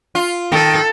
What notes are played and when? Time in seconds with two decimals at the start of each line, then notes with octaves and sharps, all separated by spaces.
0.15 F4
0.52 D#3 A4